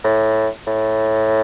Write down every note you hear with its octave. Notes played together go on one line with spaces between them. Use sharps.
A2
A2